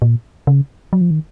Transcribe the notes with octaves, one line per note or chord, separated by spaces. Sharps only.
A#2
C#3
F#3
F3
D#3